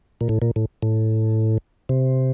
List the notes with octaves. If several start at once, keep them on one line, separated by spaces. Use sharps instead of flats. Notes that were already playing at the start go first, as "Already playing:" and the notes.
A#2
A2
A#2
A2
A2
C3